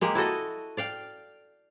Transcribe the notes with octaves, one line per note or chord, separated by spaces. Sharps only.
G#3 A#3 G4
E4 F#4 A4 D#5
D5 F5 G5